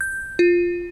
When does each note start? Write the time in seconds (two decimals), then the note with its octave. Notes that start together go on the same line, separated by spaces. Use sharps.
0.01 G6
0.39 F4